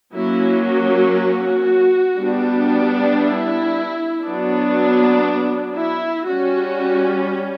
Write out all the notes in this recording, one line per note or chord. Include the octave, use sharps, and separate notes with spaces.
F#3 A#3 C#4 E4
F#4
F#4
G3 B3 D4
E4
F#3 B3 D4
E4
G3 C#4 F#4